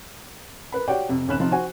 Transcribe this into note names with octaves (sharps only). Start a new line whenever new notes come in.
A#4 B4 B5
F#4 G4 C#5 D5 F#5 G5
F2 C3
D#1 G#1 C#4 B5 F#6 E7
C3 F3 D#4 F4
F#4 C5 G#5